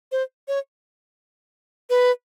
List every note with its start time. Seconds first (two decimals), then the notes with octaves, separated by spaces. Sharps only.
0.12 C5
0.48 C#5
1.90 B4